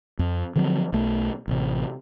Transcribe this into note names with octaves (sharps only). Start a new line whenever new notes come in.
F2
D3 F3 F#3 C4
B1 A3
A1 C3